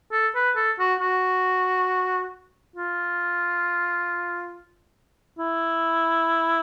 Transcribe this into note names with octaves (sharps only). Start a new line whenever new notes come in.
A4
B4
A4
F#4
F#4
F4
E4